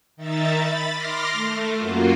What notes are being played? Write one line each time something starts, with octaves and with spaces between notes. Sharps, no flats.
D#3 D#4 E5 A6
B5 A6
C6 D6 F6 A#6
A3
F#2 F#3 A#3 F4